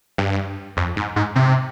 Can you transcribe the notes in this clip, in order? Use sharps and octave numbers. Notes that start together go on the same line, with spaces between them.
G2
F2
G#2
G#2
C3